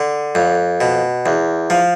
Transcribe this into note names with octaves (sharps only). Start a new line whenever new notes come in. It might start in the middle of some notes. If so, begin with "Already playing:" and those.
Already playing: D3
F2
B2
E2
F3